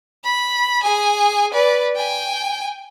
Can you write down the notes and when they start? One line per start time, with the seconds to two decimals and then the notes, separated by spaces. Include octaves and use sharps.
0.24 B5
0.83 G#4 G#5
1.53 B4 D5
1.96 G5 G#5